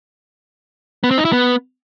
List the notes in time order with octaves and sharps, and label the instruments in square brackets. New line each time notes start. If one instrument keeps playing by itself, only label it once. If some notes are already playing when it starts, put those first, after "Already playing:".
[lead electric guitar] B3
C4
D#4
E4
B3